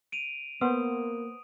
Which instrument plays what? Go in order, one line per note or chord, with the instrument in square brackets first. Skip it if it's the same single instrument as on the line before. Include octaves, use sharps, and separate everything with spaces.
[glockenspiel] D7 D#7 F7
[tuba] A#3 [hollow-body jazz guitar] B3 C5 [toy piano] B4 F#5 C6 [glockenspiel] D#6